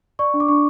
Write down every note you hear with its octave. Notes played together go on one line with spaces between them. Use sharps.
D5 C#6
D4
D6
D4 C#6